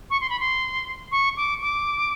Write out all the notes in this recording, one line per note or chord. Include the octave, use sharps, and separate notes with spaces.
C#6
C6
B5
C6
C#6
D6
D6